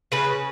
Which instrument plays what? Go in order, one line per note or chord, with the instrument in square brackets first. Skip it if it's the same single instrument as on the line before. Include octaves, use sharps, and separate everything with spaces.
[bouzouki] C#3 B4